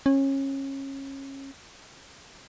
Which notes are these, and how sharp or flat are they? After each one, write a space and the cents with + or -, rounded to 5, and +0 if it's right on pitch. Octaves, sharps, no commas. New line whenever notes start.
C#4 -25